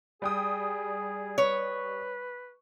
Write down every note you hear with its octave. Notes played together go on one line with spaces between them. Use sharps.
G3 G#4 G5 D#6
B4 C#5